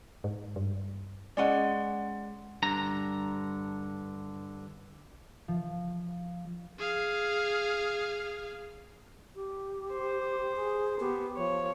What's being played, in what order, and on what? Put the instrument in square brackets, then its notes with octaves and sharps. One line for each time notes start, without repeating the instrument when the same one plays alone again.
[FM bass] G#2
G2
[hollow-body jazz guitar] G#3 C#4 D#5 [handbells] D5 F#5
[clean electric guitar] G2 D3 A#5
[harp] F3
[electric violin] G#4 F5
[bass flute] G4
[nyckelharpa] C5
[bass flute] G#4
[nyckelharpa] B3 [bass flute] G4
[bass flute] F3 [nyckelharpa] C#5